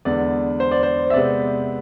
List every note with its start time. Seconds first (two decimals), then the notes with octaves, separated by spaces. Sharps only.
0.05 E2 D3 G#3 B3 D5
0.60 C5
0.72 D5
0.83 C5
1.10 E5
1.14 C3 G#3 B3 D5